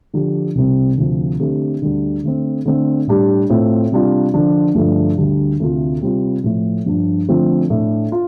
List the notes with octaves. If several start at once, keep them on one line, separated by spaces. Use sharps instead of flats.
D3 F3 D4 G4
C2 C3 G3 C4
D2 C3 F3 C4
D3 A3 C4 G4
D2 D3 G3
D3 A3 C4
D3 A3 C4
A2 G3 D4 G4
A2 A3 C4 F4
C3 G3 D4 F4
D3 F3 D4
G2 D3 F3 A3
D2 D3 G3 D4
D2 C3 A3 F4
C3 G3 C4 F4
A2 F3 A3
G2 F3 D4
D3 F3 A3 C4 F4
A2 A3 D4
F4